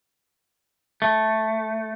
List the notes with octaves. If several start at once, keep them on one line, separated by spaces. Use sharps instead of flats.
A3